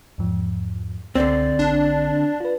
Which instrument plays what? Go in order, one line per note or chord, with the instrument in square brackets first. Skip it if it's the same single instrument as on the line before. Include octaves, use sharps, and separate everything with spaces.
[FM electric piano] E2 G#2 F3
[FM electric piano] C#2 [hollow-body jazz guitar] D3 C4 [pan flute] D5
[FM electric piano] A#1 [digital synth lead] D4
[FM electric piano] F4 B4